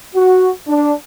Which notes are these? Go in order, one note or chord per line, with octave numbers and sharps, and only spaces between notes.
F#4
D4